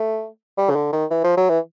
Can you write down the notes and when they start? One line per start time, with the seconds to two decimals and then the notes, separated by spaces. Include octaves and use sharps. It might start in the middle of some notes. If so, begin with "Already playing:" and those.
Already playing: A3
0.58 G3
0.70 C#3
0.75 D3
0.93 D#3
1.10 E3
1.24 F3
1.37 F#3
1.49 E3